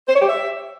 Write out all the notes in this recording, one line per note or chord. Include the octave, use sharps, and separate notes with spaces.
C5
C#5
G4
E5